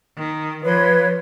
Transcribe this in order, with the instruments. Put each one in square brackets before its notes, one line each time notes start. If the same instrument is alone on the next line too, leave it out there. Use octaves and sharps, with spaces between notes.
[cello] D#3
[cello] F3 [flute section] B4 C#5